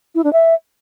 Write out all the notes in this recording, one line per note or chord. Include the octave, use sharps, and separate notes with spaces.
E4
D4
E5